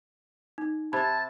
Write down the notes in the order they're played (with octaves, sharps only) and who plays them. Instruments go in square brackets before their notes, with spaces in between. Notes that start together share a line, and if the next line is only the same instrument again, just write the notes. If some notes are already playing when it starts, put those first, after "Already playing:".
[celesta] D#4
[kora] C3 [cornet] A5 [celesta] B5 G#6